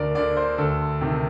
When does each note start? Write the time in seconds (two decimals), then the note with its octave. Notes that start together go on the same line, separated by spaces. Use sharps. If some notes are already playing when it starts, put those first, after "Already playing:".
Already playing: D2 A#4 D5
0.15 D3 D5
0.37 C5
0.58 D2 A4
1.01 C3 D#3